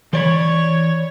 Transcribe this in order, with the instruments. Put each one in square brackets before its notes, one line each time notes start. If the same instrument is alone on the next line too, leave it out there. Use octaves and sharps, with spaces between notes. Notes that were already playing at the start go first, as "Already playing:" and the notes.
[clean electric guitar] E3 D5 B5 [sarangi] C#5